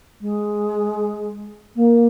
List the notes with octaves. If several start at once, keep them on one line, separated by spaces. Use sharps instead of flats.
G#3
A#3